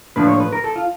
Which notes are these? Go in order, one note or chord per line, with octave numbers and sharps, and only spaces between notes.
A2 F3 A#3 D4 B4
C#5
B4
A#4
A4
F4